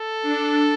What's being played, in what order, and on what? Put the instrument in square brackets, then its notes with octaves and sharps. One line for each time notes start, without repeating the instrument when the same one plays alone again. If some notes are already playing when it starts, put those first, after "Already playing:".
Already playing: [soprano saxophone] A4
[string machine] D4